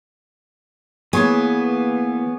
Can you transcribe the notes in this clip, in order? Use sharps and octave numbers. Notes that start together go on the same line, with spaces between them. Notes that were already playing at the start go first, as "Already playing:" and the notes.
E3 A#3 B3 G#4 C#5 D6